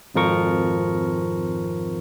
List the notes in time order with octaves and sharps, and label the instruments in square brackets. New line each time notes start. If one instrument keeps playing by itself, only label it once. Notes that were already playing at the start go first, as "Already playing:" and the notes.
[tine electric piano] G#1 F2 F3 A#4 C#6